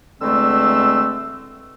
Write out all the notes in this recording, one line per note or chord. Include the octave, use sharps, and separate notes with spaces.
E2 D3 G#3 A3 C4 E6